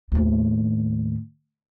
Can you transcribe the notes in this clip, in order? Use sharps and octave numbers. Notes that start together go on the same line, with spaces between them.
D#2 A2